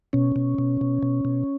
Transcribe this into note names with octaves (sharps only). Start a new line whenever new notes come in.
B2 C#4
B2
B2
B2
B2
B2